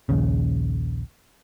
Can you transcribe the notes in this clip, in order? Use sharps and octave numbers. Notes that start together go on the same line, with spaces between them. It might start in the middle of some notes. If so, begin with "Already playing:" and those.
A#1 D#2 C#3